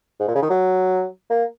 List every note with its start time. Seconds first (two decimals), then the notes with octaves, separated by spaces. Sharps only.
0.20 G#2
0.28 A#2
0.35 C#3
0.42 D#3
0.50 F#3
1.30 A#3